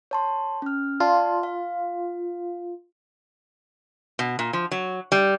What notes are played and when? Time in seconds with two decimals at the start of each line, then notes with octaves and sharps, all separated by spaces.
0.11 C#5 A5 C6
0.62 C#4 F6
1.00 F4 D5 A5 C6
1.43 F5
4.19 B2
4.39 A#2
4.53 F3
4.71 F#3
5.12 G3